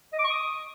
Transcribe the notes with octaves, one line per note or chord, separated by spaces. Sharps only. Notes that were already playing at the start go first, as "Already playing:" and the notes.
D#5
D6
C#6
D#6